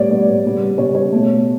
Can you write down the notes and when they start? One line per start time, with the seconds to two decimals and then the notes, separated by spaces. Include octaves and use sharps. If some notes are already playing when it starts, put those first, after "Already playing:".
Already playing: A2 G3 B3 C#5 D5
0.11 A2 G3 B3 D5
0.44 C#3 G3 B3
0.78 C#3 G3 B3 C#5
0.95 C#5
1.12 B2 A3